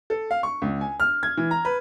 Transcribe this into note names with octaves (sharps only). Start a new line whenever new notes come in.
A4
F5
C#6
C#2
G#5
F6
G#6
E3
A#5
B4